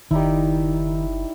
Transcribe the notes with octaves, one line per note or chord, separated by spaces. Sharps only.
F#1 D#3 G3 D#4 E4